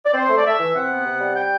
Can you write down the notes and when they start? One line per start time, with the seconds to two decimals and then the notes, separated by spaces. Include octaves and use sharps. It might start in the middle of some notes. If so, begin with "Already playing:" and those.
0.05 D5
0.13 C4 C5
0.29 A3
0.36 D5
0.44 A3 E5
0.59 E3
0.75 C3 F#5
0.90 B3
1.05 C3
1.21 G3
1.35 G5